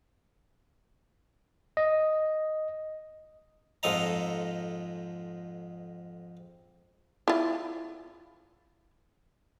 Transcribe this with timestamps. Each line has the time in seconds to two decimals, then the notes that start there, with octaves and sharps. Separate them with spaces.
1.77 D#5
3.83 F2 G#2 F3 A4 D#5 A#5
7.28 E4 F4